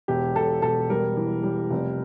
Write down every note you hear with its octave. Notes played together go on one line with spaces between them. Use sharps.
E1 G4
E1 A4
E1 A4
G3 A#4
E3
G3
F1